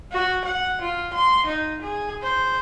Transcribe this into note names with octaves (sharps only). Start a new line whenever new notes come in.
F#4
F#5
F4
C6
D#4
G#4
C5